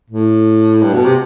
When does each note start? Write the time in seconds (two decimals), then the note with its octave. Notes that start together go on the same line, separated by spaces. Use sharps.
0.10 A2
0.82 G2
0.93 B2
1.05 C3